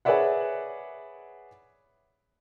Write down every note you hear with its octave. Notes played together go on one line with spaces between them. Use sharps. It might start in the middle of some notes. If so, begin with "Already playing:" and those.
G#4 B4 C#5 D5 E5 F#5